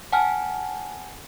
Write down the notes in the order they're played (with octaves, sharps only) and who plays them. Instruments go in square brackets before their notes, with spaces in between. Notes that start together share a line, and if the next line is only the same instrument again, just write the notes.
[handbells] F#5 G#5 A5 F6